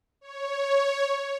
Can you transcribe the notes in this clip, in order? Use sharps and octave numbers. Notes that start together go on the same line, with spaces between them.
C#5